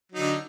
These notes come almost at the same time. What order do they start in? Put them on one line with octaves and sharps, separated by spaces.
F#3 D#4 D3